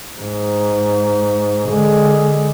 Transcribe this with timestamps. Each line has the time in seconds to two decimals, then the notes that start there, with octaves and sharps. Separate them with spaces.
0.20 G#2
1.69 D3 G#3